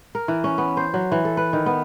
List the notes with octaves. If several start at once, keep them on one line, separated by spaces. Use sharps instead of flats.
A#4
E3
C#4
B3
C5
F#3
E3
A4
B4
D#3
B3